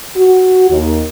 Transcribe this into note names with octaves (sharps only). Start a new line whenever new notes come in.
F#4
D#2